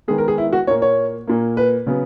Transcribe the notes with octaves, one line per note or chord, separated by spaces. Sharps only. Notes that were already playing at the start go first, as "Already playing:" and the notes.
D#3 G#3 B3 G#4
A#4
G#4
E4
F#4
A#2 A#3 C#5
C#5
A#2 A#3
B4
C#3 F#3 B3